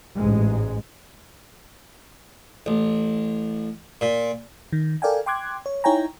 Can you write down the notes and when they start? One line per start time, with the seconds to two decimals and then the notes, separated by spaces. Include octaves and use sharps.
0.15 A1 G#2 G#3
2.66 A1
4.01 A#2
4.73 D#3
5.02 A4 A#4 D5 F5 G5 G#5
5.26 G5 C6 D6 F#6 G#6
5.66 C#5
5.84 D#4 E4 C#5 G5 G#5 A#5